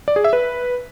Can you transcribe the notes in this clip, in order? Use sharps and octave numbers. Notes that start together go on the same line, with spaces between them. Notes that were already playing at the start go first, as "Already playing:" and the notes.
D5
G#4
E5
B4